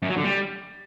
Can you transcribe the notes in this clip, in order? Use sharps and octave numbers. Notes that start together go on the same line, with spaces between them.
F#2
F#3
D3
G3